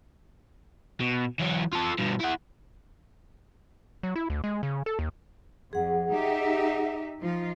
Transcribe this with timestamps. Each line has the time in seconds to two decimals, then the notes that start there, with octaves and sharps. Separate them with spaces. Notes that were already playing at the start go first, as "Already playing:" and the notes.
1.00 B2
1.40 E3 F#3
1.73 F4 A4
1.98 G2 B2
2.20 E4 F#5
4.03 F#3
4.16 E4
4.30 D2
4.44 G#3
4.63 C#3
4.86 A4
4.99 D#2
5.73 F2 G#4 F#5
6.12 D#4 G4 E5
7.20 F3 D#4 F4